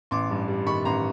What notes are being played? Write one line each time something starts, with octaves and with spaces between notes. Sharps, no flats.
A1 C6 D6
G2
G3
D#3 B5 C#6
A1 A#5 C6